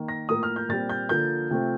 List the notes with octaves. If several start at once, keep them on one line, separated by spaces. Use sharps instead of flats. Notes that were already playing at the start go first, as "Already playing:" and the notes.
Already playing: D#3 A#3
A#6
A2 F3 A#3 D#6
F6
G6
A#2 G3 C4 A6
G6
D3 F3 A#3 G6
C3 F3 A3 C4